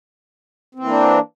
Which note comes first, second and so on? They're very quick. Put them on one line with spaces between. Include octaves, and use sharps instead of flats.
C4 E3 A#3 D4